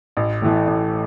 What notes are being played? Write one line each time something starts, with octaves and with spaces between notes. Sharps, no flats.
A1
A2 E3 A3
A1